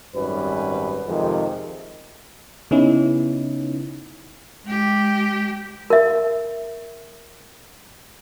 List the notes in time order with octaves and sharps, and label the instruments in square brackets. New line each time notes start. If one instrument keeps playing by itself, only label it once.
[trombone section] G#1 F#2 G3 B4
F2 C3 D#3 G#3
[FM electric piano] C#3 B3 C#4 D#4 E4
[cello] G#3 G4
[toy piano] A#4 E5